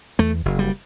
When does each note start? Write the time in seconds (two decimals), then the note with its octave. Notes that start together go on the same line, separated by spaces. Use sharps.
0.19 E2 A3
0.45 F#1
0.59 G3